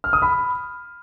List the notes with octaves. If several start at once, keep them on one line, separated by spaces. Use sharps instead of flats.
F6
D#6
B5